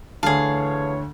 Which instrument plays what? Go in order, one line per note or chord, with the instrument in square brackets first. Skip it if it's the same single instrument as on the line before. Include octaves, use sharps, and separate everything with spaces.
[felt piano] D2 D3 [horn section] E3 C#5 [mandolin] G#4 F5 [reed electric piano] A5